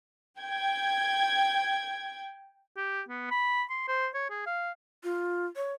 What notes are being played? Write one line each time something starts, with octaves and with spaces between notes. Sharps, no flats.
G5 G#6
G4
B3
B5
C6
C5
C#5
G#4
F5
F4
C#5